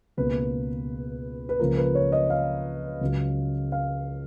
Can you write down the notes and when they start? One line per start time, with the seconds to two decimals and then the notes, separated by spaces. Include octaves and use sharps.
0.17 C#2 B2 A#3 B4
1.49 B4
1.60 C#2 C#3 F3 A#3 A#4
1.77 B4
1.95 C#5
2.12 D#5
2.30 F5
3.01 C#2 C#3 F#3
3.72 F5